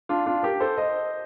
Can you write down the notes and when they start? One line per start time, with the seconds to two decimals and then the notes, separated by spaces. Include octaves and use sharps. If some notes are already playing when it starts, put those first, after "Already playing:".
0.09 D4 F4
0.26 D4 F4
0.43 G4 A#4
0.60 A4 C5
0.78 C5 D#5